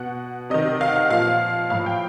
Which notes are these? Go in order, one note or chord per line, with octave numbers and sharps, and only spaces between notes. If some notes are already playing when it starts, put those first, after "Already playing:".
Already playing: B2 F#5
C3 D#3 D#5
F5
F#5
F5
A#2 F3 F5
A2 F3 F5
G5